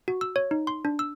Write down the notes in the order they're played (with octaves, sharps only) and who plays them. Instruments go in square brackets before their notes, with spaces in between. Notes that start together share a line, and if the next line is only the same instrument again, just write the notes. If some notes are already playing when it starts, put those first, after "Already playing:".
[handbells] F#4
E6
C#5
D#4
C6
D4
E6